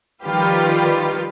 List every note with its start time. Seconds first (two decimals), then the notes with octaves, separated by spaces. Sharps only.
0.23 D#3 F3 G3 F4 G4 B4